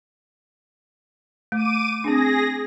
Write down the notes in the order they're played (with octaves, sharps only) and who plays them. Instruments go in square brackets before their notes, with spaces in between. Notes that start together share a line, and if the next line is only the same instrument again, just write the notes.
[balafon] A3 [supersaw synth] D6 D#7
[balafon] C4 D4 [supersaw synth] G#4 A#6